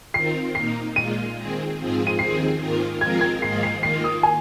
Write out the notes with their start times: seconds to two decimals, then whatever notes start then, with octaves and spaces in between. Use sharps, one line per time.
0.14 D#3 C4 F4 A#4 C7
0.54 A#2 A#3 D#4 C7
0.96 A#2 G#3 F4 D#7
1.36 D#3 C4 G#4
1.78 G#2 F3 C4 F4 G#4
2.07 D#7
2.19 D#2 D#3 C4 G#4 C7
2.60 G#2 D#3 A#3 F4 A#4
3.00 F3 G#3 C4 F4 A#4 G#6
3.21 G#6
3.42 G#2 D#3 A#3 F4 G#4 C7
3.63 C7
3.83 D#3 A#3 F4 C7
4.04 D#6
4.23 G#5